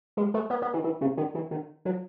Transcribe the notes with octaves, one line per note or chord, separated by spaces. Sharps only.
G#3
A3
B3
B3
E3
E3
C#3
D#3
E3
D#3
F#3